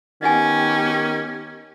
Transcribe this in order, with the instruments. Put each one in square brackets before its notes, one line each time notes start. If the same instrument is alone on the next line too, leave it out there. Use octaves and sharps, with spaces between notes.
[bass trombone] D#3 [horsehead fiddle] B3 G4 [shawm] C#4 [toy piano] D#5 F#5 G#5